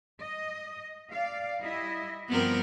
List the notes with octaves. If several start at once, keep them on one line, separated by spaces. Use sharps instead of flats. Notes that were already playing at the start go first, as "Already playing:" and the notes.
D#5
D5 F5
G3 E4 D#5
G2 F3 G3 B3 C4 A#4